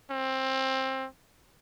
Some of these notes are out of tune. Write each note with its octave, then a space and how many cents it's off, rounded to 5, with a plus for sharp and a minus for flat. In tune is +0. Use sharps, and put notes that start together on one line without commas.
C4 +20